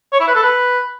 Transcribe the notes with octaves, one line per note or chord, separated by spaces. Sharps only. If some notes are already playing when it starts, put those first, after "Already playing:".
C#5
E4
B4
A4
B4